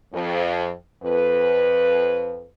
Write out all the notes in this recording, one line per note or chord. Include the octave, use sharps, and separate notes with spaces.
F2
F2 B4